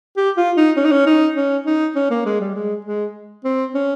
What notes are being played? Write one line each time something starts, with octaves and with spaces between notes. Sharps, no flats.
G4
F4
D#4
C#4
D#4
C#4
D#4
C#4
D#4
C#4
A#3
G#3
G3
G#3
G#3
C4
C#4